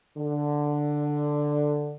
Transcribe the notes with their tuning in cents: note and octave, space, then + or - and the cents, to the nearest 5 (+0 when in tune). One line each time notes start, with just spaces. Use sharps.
D3 +5